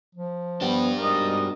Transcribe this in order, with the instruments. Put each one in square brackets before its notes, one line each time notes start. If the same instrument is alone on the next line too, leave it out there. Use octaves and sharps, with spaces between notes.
[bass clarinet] F3
[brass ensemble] B3 [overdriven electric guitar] D4 G4
[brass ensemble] G#2 B2 G3 [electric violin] A#4 D#5